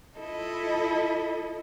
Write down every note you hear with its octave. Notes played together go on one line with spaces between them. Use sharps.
E4 F4 A4 D#5